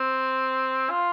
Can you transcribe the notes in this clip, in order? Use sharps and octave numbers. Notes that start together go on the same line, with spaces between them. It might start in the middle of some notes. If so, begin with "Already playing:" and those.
Already playing: C4
F4